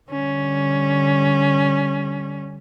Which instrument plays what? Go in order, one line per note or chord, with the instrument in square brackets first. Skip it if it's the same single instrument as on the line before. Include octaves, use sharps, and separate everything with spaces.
[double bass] D3 G3 [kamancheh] C#4